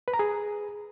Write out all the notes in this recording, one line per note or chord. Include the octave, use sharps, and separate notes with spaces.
B4
A#5
G#4